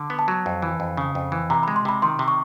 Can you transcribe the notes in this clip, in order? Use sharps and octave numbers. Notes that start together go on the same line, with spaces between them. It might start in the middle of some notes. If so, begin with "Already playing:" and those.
Already playing: D3
B3
A5
F#3
F2
E3
F2
C#3
F2
E3
C3 A#5
B5
G#3
C6
C3 B5
D#3 C6
C3
C#6